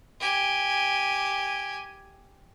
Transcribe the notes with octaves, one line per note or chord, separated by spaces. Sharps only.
G4 G#5